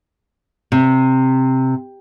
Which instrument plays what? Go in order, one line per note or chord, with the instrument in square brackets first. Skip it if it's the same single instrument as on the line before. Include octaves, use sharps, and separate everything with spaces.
[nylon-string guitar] C3